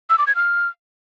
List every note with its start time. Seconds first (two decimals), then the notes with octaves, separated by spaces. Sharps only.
0.10 E6
0.18 D6
0.27 G#6
0.35 F6